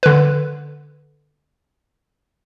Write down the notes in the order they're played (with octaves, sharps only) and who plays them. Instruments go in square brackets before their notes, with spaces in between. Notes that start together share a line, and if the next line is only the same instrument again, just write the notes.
[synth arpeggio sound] D3 B4